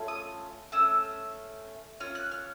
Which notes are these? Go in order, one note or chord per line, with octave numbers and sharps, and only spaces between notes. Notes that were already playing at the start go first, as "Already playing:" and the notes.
Already playing: A3 C#4 F4 A4
D#6
A3 C#4 E6
C#4 F4 F6
F#6
F6